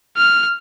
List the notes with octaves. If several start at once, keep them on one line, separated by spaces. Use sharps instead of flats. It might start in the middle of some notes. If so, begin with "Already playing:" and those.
F6